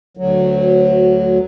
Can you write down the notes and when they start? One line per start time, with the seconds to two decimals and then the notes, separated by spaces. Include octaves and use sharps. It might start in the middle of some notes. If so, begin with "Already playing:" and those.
0.17 D2 F#3